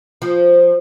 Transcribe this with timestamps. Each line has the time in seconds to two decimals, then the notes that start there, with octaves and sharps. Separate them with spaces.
0.22 F3